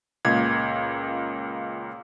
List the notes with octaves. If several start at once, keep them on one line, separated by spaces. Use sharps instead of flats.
C#2 A#2 G#6